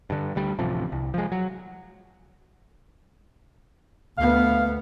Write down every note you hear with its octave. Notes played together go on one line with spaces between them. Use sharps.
G2 D3
D2 G3
D1 A1 C3 F3
C2
F3 G#3
F#3
D2 B3 F5